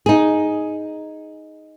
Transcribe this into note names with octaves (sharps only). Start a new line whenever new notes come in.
D#4 G#4